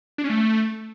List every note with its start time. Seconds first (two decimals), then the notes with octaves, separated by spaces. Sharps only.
0.18 D4
0.24 C#4
0.30 A3